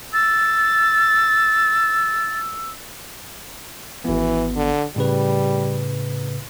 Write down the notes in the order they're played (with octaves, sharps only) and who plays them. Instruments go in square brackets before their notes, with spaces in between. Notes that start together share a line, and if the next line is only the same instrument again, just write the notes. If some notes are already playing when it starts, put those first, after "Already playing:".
[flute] E6 [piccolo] A6
[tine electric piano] G#1 B3 [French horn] E3
[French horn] D3
[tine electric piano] A2 C#3 B4 [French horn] G3